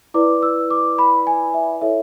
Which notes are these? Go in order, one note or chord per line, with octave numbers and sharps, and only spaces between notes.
E4 B4 D5 D6
E6
D6
B5
G#5
E5
E4 A4 C#5 E5